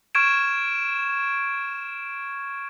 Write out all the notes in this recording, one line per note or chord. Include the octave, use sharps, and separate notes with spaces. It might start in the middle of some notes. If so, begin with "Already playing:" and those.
C#6 F6 G#6 D7 E7